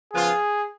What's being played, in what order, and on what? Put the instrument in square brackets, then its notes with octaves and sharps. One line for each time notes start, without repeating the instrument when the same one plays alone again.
[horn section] C#3 F3 B3 F4 [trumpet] G#4